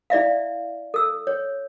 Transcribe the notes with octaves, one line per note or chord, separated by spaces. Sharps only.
E4 D5 E5 F5
A4 E6
C#5